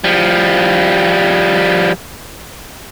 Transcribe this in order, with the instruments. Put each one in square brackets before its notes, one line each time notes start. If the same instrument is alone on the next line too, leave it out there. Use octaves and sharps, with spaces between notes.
[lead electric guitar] F3 G3